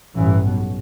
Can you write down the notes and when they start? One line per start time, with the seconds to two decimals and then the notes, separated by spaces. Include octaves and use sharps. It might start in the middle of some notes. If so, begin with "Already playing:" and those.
0.16 A1 G2 E3
0.44 B1 B2